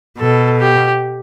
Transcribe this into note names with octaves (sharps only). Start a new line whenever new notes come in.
B2 A4
G4